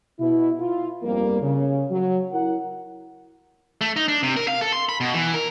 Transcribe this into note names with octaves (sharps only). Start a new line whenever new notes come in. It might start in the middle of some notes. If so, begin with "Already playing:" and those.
B2 E4
E4 F4
G1 F2 G3 A#3
C#3
F#3
E4 A#4 F#5
A3
D#4
D4
C3
A#4
F5
A4
C6
B5
B2
E3
A#4